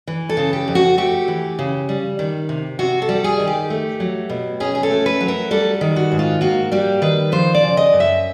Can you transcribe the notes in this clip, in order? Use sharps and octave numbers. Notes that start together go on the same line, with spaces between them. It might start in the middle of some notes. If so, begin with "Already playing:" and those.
E3
A4
C#3
G4
F2
F#4
A3 G4
E3
C#3
G3
D#3
C3
C3 F#4
A4
G3
G#4
D#3
G4
A3
F#3
B2
C#4 G#4
G#4
A4
A3
B4
F#3
A#4
G3 A4
D#3
F#4
G#2
F4
A#3 F#4
G3 G4
D#3 B4
F3 C5
D5
C#3
D#5
F#2
E5